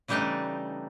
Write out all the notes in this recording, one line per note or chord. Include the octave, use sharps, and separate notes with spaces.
C#3 E3 G3 A3 D4 D#4